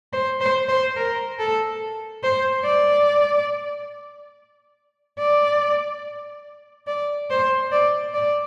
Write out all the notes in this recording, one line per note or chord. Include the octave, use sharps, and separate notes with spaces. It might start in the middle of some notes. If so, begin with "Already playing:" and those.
C5
C5
C5
A#4
A4
C5
D5
D5
D5
C5
D5
D5